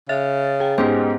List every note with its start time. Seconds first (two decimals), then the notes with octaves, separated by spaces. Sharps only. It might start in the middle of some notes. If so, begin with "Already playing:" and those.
0.09 C#3 E5 A6
0.60 G#4 G5
0.78 G#2 G#3 B3 C#4 G4 C5